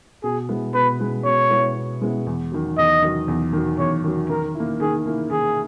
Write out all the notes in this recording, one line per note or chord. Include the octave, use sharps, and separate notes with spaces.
B2 G#4
G#3 B3 E4
B2 B4
G#3 B3 E4
B2 C#5
G#3 B3 E4
B2
G#3 B3 E4
E2
D#3 F#3
E2 D#5
D#3 F#3
E2
D#3 F#3
E2 C#5
D#3 F#3
D#3 A#4
A#3 E4
D#3 G#4
A#3 E4
D#3 G#4